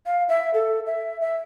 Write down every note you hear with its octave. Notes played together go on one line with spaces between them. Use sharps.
F5
E5
A4
E5
E5